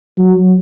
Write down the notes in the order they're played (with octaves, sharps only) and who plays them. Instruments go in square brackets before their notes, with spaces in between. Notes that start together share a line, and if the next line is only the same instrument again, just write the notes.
[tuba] F#3